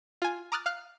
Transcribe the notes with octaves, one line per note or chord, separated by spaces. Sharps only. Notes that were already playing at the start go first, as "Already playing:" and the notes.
F4 G#5
A#5 D6 D#6 F6 F#6 A6
F5 F6 F#6